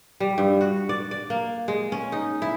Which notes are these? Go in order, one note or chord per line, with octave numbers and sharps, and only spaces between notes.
G3
G2
F#4
D5
D5
A#3
G#3
C#4
D#4
E4